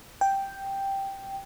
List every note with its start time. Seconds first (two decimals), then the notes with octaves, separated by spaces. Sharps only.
0.21 G5